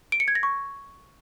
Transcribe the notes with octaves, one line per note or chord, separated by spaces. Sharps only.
D7
C#7
G#6
A#6
C#6